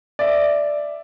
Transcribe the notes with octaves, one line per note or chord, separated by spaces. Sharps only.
D5 E5